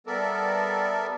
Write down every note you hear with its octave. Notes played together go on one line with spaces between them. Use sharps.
G3 B3 A4 A#4 D5 E5